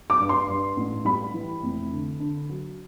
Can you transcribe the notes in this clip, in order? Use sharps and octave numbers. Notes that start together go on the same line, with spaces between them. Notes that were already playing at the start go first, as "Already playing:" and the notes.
D6
G2
C6
G2
A1
G3 B5
E3
F1
D3
D3
F#3